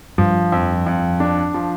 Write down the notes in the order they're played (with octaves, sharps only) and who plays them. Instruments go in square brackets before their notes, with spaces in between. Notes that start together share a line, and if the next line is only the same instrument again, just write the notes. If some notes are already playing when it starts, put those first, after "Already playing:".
[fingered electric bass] G2 [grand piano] F3
[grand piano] F2
F2
D4
F3